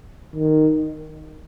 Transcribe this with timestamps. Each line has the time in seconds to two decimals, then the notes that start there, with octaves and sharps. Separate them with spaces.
0.36 D#3